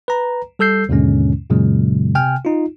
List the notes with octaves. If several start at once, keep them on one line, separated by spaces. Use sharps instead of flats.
B4 A#5
G3 A4 E6 G6 C7
D#2 G#2 B2 D3 G#3 C#4
F#2 A#2 C#3 F#3 G#3
C3 G5 G#5 F6
D#4 F4